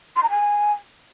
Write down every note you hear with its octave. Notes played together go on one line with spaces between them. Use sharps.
C6
A#5
G#5